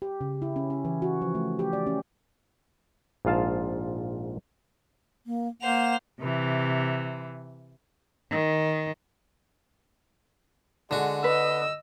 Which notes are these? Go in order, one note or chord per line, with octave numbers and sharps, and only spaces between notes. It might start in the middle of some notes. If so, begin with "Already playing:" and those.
G4
C#3
E4
C#4
C#4
E3
F#4
F3
A3
G4
D5
C#4
A#1 G#2 F4 F5 A5
A#3
A#3 C5 F#5 F7
C3 E3
D#3
D3 G#3 F#4
B4 D#5 E6